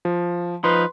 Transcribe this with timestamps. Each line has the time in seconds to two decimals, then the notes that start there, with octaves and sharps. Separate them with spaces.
0.05 F3
0.64 F3 D#4 B4 C6